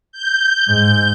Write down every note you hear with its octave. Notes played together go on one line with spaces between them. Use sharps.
G6
G#2